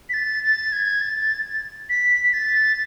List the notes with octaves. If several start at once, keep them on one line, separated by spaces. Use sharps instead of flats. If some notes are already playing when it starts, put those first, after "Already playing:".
B6
A6
A6
G#6
A6
B6
B6
A6